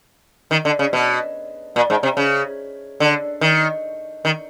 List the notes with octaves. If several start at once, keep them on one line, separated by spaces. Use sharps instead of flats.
D#3
D3
C#3
B2
A#2
G#2
C3
C#3
D3
D#3
D#3